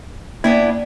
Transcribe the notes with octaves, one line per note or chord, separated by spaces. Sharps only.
A#3 B3 D4 E4